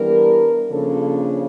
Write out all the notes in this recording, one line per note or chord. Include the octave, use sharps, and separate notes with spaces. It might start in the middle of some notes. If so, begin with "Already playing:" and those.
Already playing: E3 G3 B3 D4 A#4
C#3 F3 A#3 D4 A4